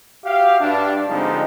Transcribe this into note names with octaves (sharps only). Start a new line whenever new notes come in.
F#4 G4 E5 F5
G2 D4
D3 F3 G3 G#3 C4 D#4